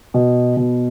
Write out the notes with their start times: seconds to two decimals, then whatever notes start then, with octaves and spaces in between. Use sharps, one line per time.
0.14 B2
0.57 B2